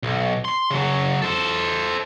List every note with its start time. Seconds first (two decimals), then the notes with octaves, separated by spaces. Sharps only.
0.03 B1
0.45 C6
0.70 C#3 F#3
1.22 A4 C5